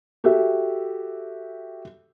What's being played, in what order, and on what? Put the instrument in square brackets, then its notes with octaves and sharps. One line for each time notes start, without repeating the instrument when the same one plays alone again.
[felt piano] F#4 G4 A4 E5